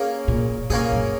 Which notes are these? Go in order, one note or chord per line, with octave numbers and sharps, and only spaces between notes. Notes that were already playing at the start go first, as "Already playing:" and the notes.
Already playing: A#3 C#4 G#4
A#2
A#2 A#3 C#4 G#4
F#2